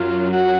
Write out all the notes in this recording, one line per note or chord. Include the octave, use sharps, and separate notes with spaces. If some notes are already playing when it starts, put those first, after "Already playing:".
Already playing: F#2 F#3 F4
F#4